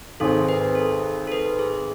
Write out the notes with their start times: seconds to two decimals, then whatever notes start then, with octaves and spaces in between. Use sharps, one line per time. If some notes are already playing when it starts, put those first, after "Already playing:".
0.20 G#1 G#2 G#3 C4 A4
0.49 B4
0.75 A4
1.27 A4
1.32 B4
1.59 G#4